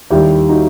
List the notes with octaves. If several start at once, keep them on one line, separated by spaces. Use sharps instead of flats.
D#2 D#3 G3 E4 G4
D#4 F#4